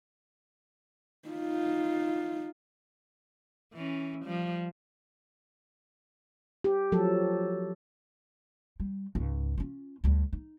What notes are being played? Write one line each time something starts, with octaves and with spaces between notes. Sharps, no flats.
D#4 F4
E3 C#4
F3 G3
G4
F3 F#3 A4
G3
C#2 G#2
C#4 F4
D2 G3
D#4